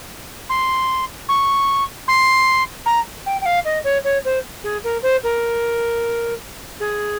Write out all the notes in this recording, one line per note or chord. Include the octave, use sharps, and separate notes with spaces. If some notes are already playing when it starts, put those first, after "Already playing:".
C6
C#6
C6
A#5
G5
G5
F5
D#5
C#5
C#5
C5
G#4
A#4
C5
A#4
G#4